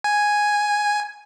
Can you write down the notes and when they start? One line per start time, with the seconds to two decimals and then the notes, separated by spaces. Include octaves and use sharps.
0.04 G#5